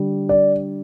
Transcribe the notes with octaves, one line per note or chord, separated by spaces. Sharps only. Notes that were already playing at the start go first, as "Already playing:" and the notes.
Already playing: D3 G3
D5